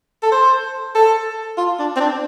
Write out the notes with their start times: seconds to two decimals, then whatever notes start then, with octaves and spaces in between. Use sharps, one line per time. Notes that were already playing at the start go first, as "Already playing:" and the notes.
0.23 A4
0.32 C5
0.95 A4
1.57 F4
1.79 D4
1.96 C4
2.00 D4